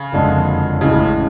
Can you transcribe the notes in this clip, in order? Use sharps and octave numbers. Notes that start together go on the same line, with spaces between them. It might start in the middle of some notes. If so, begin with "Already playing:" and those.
Already playing: C#3
F#1 F2 D3 G#3 D4
A1 A2 C#3 G#3 D4